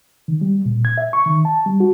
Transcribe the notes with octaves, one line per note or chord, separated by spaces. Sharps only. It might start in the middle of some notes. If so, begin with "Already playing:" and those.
D#3
G3
A#2
G#6
E5
C#6
D#3
A5
G3
F#4